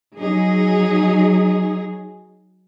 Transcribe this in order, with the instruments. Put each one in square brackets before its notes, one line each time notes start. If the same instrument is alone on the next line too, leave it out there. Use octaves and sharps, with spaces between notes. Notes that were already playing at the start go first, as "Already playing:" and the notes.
[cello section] F#3 D#4 G#4